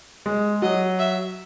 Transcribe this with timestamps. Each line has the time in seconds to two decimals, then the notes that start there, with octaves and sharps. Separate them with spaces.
0.26 G#3
0.62 F#3 D#5
0.99 E5